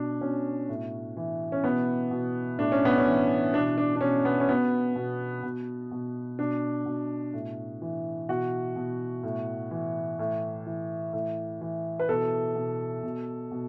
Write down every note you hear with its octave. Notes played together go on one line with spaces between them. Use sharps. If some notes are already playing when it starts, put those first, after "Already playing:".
Already playing: B2 D4
B2 C#4
A2
E3
C#4
B2 B3
B2
A2 D4
C#4
B3
C#4
E3
B2 D4
D4
D4
B2 C#4
B3
C#4
B2 B3
B2
B2
B2
B2 D4
B2
A2
E3
B2 F#4
B2
A2
E3
A2
E3
A2
E3
B4
B2 A4
B2
B2
B2